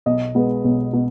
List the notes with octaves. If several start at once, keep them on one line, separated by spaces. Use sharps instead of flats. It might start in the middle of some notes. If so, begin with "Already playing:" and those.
B1 D#5
B2 G#3 B3
B1
B2